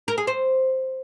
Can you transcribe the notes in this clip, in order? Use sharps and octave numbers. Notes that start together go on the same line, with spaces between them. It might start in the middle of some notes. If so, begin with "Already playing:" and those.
A#4
G#4
C5